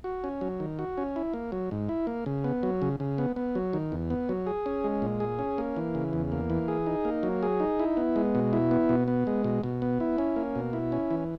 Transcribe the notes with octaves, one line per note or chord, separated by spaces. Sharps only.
F#4
C#4
F#3
D#3
F#4
C#4
E4
A#3
F#3
G#2
E4
A#3
C#3
B3
F#3
C#3
C#3
B3
B3
F#3
D#3
E2
B3
F#3
G#4
C#4
G#3
A#2
G#4
C#4
A#3
E3
C#3
E2
A#3
E3
G#4
D#4
A#3
F#3
G#4
D#4
E4
B3
G#3
B2
E4
B3
B2
B3
G#3
B2
B2
B3
E4
C#4
A#3
B2
E4
C#4
E3